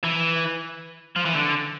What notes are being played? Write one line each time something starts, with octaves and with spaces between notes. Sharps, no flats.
E3
F3
E3
D3